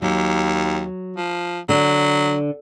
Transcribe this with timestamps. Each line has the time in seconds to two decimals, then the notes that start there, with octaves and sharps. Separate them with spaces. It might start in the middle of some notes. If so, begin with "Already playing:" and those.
0.02 D#2 F#3
1.16 F3
1.69 D3 F#3